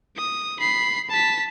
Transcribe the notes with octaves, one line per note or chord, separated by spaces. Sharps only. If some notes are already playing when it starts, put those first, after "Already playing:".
D#6
B5 C7
A5 B6